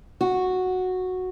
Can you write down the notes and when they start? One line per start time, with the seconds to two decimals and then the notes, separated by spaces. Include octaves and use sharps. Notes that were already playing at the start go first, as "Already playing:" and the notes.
0.21 F#4